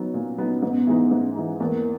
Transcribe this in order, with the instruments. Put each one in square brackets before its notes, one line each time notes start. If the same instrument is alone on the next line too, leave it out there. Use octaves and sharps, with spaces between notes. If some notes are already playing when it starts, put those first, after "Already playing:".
Already playing: [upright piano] F#3 B3 D#4
A#2
F#3 B3 D#4
[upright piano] G#2 [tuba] B3
[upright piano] E3 G#3 D#4
G#2
E3 G#3 D#4
[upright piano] E2 [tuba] A#3